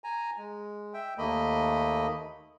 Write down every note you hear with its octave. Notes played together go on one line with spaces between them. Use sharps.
G#5 A#5
G#3
E5 G5
D#2 A3 A#3 D#5 B5